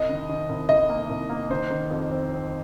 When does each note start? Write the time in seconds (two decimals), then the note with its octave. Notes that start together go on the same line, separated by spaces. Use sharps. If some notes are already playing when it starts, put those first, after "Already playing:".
Already playing: C2 D#5
0.09 D#3
0.29 D#3
0.49 C2
0.69 D#3 D#5
0.90 A#3
1.10 C2
1.30 A#3
1.50 D#3 C5
1.71 D#3
1.90 F2
2.11 C4
2.32 C4